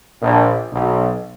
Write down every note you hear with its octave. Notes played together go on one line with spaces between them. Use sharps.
A#1
B1